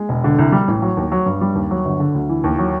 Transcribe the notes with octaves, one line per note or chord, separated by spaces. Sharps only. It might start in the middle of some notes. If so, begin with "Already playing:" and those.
Already playing: G#3
E1
D3
C2
G3
A1
F#3
D#2
F#3
G2
G3
D#2
F#3
G1
D3
D2
E3
D#2
F#3